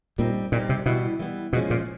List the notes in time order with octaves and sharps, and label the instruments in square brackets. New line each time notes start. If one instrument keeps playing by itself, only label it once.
[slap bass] A#2 [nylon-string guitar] G3 C4 D#4
[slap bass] A#2 [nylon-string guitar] G3 C4 D#4
[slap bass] C3
[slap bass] B2 [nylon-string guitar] E3 G3 B3 E4
[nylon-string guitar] E3 G3 B3 E4
[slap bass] B2 [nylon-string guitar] F3 G#3 C#4
[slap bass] A#2